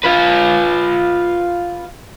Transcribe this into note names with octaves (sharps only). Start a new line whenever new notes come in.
F4 B4